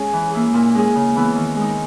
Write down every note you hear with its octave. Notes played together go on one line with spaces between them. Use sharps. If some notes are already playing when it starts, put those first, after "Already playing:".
Already playing: G#3 C#4 G#4
E3
A#3 E4 G#4
A#2
G#3 C#4 G#4
C#3
E3 B3 E4
D#3
G#3 D#4